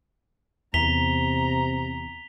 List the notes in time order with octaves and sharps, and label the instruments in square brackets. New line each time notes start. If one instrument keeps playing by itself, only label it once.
[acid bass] E2 [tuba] C3 [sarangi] A#5 [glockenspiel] B6 F7 G7